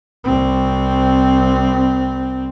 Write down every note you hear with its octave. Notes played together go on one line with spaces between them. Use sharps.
C2 C4